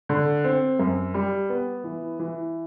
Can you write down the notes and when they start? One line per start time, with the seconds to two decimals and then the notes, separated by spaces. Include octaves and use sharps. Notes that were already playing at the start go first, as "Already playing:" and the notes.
0.09 D3
0.44 C4
0.79 F#2
1.14 G3
1.49 B3
1.84 E3
2.19 E3